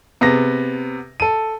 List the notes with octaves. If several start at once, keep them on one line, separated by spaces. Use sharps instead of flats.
C3 B3 G#4 A#6
A4 D#7